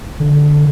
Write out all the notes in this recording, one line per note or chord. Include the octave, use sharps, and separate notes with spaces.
D3